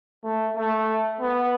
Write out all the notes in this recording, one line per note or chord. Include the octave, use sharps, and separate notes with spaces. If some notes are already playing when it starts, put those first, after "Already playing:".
A3
A3
B3